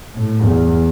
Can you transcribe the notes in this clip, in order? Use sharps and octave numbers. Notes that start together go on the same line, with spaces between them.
A2
E2